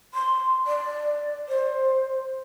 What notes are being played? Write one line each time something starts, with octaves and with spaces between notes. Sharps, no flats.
C6
D5
C5